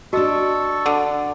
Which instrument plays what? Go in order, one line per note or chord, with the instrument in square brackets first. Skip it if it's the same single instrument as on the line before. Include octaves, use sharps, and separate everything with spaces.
[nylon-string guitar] D4 D#5 [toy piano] F#4 E6 [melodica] A4 C#6
[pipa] D3